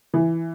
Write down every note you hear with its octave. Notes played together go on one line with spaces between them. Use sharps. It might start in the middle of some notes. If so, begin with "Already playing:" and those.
E3